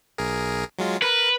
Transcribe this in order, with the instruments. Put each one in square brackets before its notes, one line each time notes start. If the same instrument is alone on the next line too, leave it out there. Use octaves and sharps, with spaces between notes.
[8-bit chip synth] B1 G#4 A#4
F#3 G#3 F4
[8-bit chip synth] A#4 [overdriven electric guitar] B4